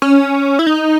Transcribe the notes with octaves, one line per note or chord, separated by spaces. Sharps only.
C#4
E4
D#4